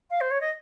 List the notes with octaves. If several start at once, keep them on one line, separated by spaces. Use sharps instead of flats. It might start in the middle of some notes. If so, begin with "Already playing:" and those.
F5
C5
C#5
D#5